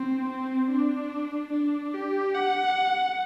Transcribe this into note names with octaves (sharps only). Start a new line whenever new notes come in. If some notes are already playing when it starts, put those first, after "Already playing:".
Already playing: C4
C4
D4
D4
G4
F#5